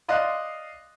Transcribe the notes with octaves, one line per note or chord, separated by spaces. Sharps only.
D5 D#5 F5 C6 F#6